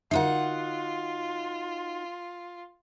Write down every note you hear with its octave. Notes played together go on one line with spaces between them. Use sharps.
D3 D#4 F4 F#4 E5 F#5